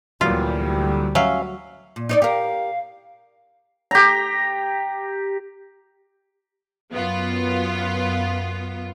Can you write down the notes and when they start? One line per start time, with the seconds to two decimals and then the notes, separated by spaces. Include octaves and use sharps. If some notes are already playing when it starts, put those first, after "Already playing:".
0.21 D2 A#2 E3 F#3 G3 F4
1.15 F#3 C#4 E5 F5
1.96 A#2
2.09 D#4 C#5 D5
2.22 G4 A#4 F5
3.91 G4 A#5
6.92 F#2 B3 F4